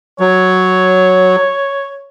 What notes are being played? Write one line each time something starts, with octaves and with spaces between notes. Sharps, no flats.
F#3 C#5